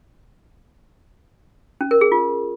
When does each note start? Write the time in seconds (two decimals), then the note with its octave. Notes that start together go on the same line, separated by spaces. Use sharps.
1.81 C#4
1.91 A#4
2.01 G#4
2.12 F4